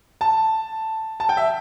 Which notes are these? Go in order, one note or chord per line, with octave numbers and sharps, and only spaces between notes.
A5
A5
G5
E5